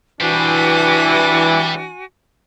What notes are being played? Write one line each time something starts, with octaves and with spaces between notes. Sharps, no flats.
E3 G3 D4 F#4 C5 G#5